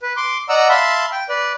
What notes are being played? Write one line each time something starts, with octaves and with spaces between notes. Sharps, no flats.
B4
C6 D6
D5 D#5 F#5 A#5 E6
E5 F5 A5 B5 C6
G5
B4 D5